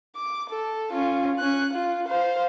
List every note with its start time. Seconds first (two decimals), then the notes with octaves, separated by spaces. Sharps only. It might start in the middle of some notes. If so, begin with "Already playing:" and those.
0.16 D6
0.50 A4
0.92 C#4 F4
1.39 C#4 F#6
1.73 F4
2.08 C5 F5